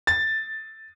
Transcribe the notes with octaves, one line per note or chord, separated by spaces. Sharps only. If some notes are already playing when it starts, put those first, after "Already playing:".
A6